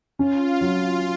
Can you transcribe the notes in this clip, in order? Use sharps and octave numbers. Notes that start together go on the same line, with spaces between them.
C#4 F4
F#3